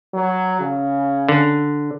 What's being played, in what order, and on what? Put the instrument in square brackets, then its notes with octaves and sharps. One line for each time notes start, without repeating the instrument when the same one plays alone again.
[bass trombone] F#3
C#3
[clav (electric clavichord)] D3